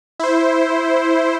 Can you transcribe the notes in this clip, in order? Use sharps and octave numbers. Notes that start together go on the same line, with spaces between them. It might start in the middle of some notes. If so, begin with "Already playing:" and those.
E4 C5